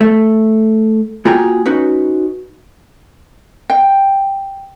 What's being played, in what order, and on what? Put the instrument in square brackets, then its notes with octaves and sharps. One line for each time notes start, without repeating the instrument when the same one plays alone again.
[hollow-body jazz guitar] A3
A#3 F4 F#4 G#4 G5 A#5
C#4 D#4 F#4 B4
[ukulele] G5